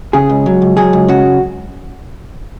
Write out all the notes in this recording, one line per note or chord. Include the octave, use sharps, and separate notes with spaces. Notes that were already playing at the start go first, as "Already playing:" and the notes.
C#3 G#4
C#2
F#3
C#2
F#3 G#4
C#2
C#3 F#4